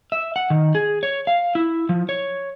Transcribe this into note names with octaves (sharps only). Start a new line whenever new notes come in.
E5
F#5
D#3
G#4
C#5
F5
E4
F3
C#5